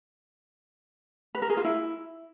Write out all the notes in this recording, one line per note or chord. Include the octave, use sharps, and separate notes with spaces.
B4
A#4
G#4
F4
E4